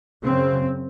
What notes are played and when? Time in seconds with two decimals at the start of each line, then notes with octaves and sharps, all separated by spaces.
0.24 F#2 C#3 C4